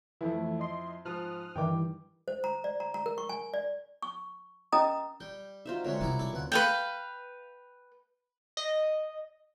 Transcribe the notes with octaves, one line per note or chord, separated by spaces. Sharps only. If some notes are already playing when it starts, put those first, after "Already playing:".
F2 E3 A3 E4
D#5 C6
G#2 F3 D#6 F6 F#6
G2 D#3 E3 G5 D6
C5
A#5
D5
A#5
A#5
A#4
C#6
G#5
D5
C#6
C#4 A#4 D#5 A#5 D#6
G3 G5
D#4 F4 F#4 C5 E5
D3 G#3 C4 C#4 A#4 C#5 E5
C3 G3 D#4 E4 D5
B2 E4 A4 D5 C#6
D2 F4 B4 F#5
B4 F5 G5
D#5